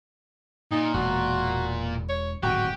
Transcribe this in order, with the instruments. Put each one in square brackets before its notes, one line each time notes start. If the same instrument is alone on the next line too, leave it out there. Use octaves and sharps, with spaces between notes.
[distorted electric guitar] A#2 [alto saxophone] D#4
[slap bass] E1 [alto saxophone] F#4
[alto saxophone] C#5
[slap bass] D1 G#1 C3 [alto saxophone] F#4 [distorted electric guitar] G4